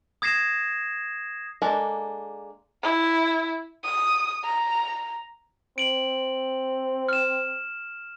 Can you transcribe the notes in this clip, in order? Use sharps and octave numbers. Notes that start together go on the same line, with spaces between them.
D#6 G#6 A#6 C7 E7
G#3 A#3 D4 A4 A#5
E4
D#6
A#5
C4 D7 F#7
F6 E7